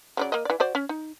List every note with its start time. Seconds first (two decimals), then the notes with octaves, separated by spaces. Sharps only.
0.17 C#3 F#3 D5
0.32 A#3 D#5
0.45 E3 D5
0.60 F#4 C5 D5
0.75 C#4
0.89 D#4